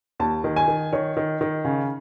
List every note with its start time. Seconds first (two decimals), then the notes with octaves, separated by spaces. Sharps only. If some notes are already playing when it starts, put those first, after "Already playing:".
0.20 D#2 A5
0.44 D#3
0.56 G#5
0.68 D#3
0.93 D#3 C#5
1.17 D#3
1.41 D#3
1.65 C#3